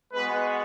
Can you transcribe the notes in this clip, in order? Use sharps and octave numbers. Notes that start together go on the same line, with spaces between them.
G#3 B3 F#4 B4